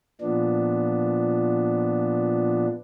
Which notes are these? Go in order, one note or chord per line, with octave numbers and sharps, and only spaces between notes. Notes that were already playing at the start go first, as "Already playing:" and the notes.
A#2 F3 B3 D4